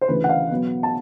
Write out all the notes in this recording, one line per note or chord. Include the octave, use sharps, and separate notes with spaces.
C5
D2 C#3 E3 B4
F#5
F5
B2 F#3 B3
A5